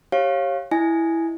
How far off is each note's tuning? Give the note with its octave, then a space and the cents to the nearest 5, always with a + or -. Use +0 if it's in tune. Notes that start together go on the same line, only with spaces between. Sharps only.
G4 -5 C#5 -25 F5 +0
E4 +0 D#5 +0 G#5 +0